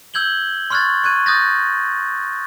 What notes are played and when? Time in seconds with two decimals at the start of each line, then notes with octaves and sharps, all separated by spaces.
0.14 E6 G6 G#6 F#7 G7
0.70 C6 C#6 F6 F#6 G#6 A6
1.04 C#6 F#6 G#6 D#7
1.26 D#6 F#6 G6 A6 A#6